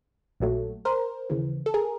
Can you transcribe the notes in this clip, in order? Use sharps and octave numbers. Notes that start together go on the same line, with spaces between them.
A#1 A#2 F#3 A3
A#4 C5
D#2 C#3 E3
A4
G#4 A#4